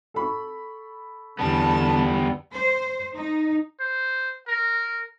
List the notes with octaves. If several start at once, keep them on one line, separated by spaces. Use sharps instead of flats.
A4 B5 C#6
E2 D3 G3 B3 A5
C5
D#4
C5
A#4